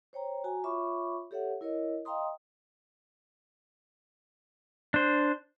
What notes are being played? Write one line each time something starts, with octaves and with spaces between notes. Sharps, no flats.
C5 C#5 G5 A#5
F#4 G#5 A#5
F4 C#5 E5 B5 C#6 D6
G4 A4 C#5 E5 F#5
E4 A#4 C#5 D#5
D#5 F5 G5 A#5 C6 D#6
D4 C5